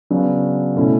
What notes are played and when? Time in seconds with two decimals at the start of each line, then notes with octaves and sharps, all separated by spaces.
0.10 C#3 F#3 B3 D4
0.76 B2 A3 C#4 E4